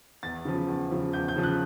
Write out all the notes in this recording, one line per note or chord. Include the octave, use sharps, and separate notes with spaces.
E2 A6
C#3 F3
E2
C#3 F3
E2 G6
G6
C#3 F3
F#6